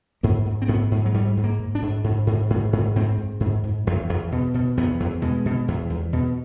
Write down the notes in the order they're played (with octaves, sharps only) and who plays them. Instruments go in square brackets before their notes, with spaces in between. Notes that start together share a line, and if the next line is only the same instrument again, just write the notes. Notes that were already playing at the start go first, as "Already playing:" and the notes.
[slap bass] G#2 A#3
G#2
C4
G#2 B3
G#2
F#3
G#2 G3
G#2
A#3
G#2
D4
G#2
G#2
G#2
G#2
G#2
G#2 C4
G#2
G#2
G#2
E2
E2
B2
B2
E2 B3
E2
B2 G#3
B2
E2
E2
B2